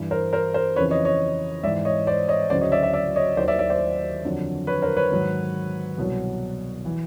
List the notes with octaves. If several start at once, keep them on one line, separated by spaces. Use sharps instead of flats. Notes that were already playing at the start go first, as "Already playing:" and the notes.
Already playing: G2 E3
A#4 C5
A#4 C5
A#4 C5
F2 C#3 E3 B4 C#5
C#5 D#5
C#5 D#5
G#2 E3 D5 E5
C#5 D#5
C5 D5
C#5 D#5
D2 C#3 F#3 C5 D5
C#5 D#5
D5 E5
D5 E5
D5 E5
C#5 D#5
D#2 D#3 F#3 C5 D5
D5 E5
D5 E5
C5 D5
F2 D3 F#3
B4 C#5
A#4 C5
B4 C#5
G#2 D#3 F#3
C2 B2 F#3
E3